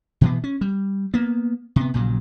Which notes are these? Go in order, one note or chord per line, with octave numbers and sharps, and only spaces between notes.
B2 E3 B3
C#4
G3
A#3 B3
C3 B3
A#1 A#2 C#3 F#3